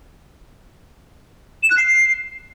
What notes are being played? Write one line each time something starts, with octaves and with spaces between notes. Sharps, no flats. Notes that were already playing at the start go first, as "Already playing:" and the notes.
E7
F#6
C7